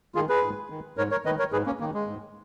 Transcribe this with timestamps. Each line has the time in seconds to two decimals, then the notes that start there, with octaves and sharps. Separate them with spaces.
0.15 D#3 F4 G#4
0.29 G#4 B4
0.43 G#2
0.70 D#3
0.97 G#2 A#4 C#5
1.11 A#4 C#5
1.25 D#3 B4 D#5
1.39 A#4 C#5
1.52 G#2 G#4 B4
1.66 A#3 C#4
1.80 D#3 A#3
1.94 G#3
2.07 G#2